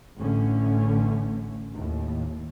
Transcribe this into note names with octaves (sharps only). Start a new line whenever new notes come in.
A1 A2 D3 A3 C#4
D#2 A2